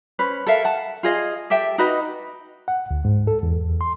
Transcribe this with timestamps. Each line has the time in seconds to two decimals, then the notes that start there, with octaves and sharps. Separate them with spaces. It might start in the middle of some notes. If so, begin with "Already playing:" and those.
0.19 C#4 B4 C5
0.46 A4 A#4 E5 F5
0.65 F#5 A5
1.03 F4 G#4 D#5 F5
1.50 G4 A4 E5 G5
1.78 D#4 F#4 B4 D#5
2.68 F#5
2.91 D2
3.05 G#2
3.27 A4
3.43 E2
3.81 C6